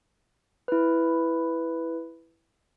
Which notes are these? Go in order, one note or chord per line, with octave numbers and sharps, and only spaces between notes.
E4 B4